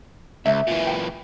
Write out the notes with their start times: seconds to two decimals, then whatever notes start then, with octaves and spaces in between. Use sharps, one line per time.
0.46 C#2 E5
0.67 A#2 E3
0.87 G5